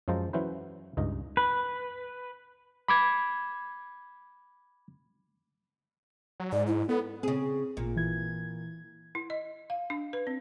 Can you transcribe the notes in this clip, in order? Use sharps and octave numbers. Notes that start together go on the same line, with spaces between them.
F#2 F3 G#3 C5 A5 A#5
E3 F#3 C#4 E4 B4 C5
C#2 G2 D#4 A#5
B4
B5 D6 G#6
F#3
G#2 D5
E4
B3 A4
C#3 C4 G#4
A1 A#2
E3 E4 G#6
E4
D#5
F5
D4
B4
C4